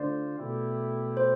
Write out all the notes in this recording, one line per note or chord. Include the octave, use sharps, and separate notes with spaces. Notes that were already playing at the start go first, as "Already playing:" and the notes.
Already playing: D3 A3 D4 F4 C5 D5
B2 A3 E4 G4
C5